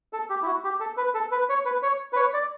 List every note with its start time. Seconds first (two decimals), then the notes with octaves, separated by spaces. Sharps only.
0.13 A4
0.30 G4
0.42 E4
0.46 F#4
0.64 G4
0.80 A4
0.97 B4
1.14 A4
1.31 B4
1.49 C#5
1.65 B4
1.83 C#5
2.13 B4
2.16 C#5
2.34 D5